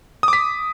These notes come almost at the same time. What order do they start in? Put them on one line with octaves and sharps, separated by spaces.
D#6 D6 B6